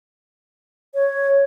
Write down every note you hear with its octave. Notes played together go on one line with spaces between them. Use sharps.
C#5